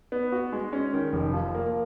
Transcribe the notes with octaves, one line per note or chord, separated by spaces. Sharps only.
B3
F#4
G#3
C#4
D#3
F1
F3
A#3